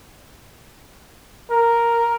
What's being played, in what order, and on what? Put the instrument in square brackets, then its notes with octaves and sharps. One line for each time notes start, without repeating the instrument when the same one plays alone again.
[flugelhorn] A#4